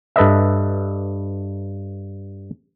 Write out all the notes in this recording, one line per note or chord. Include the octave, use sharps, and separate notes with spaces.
G2 A4 B4 D#5 E5